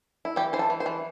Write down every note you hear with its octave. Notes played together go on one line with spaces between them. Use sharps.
E4
E3 G4
E3 C5
A4
E3
C5
E3